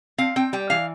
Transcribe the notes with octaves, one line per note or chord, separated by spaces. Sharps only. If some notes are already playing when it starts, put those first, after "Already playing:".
C4 F5
C4 G5
G3 G5
E3 F5